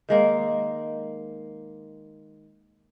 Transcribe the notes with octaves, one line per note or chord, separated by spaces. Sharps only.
D#3 G#3 A#3 F5